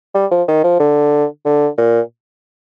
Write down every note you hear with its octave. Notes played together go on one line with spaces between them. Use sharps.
G3
F3
D#3
F3
D3
D3
A#2